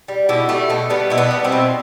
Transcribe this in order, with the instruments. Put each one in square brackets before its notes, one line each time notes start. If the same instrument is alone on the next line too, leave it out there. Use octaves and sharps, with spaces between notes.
[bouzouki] G3
B2 E4 G4
G3 A3
B2 A3
G3 B3
B2 E4
B3 D4
G3
C4 E4
B2